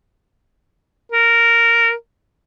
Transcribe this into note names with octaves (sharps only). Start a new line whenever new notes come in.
A#4